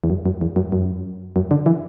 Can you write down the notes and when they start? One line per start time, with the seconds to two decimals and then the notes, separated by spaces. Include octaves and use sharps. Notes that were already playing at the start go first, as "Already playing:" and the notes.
0.04 E2
0.10 F#2
0.26 F#2
0.41 E2
0.56 F#2
0.72 F#2
1.36 F#2
1.51 D3
1.66 E3